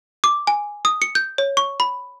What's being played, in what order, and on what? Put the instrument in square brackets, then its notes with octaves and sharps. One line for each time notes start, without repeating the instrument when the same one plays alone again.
[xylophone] D6
G#5
D#6
C#7
G6
C#5
C#6
B5